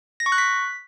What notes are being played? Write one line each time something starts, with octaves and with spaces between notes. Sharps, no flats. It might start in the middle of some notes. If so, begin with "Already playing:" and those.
A#6
C#6
F#6
B6